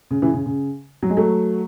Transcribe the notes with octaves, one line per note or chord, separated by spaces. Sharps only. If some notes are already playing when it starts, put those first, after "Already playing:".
C#3
C#3 E3
C#3
C#3
F#3
G#3
F#3 A3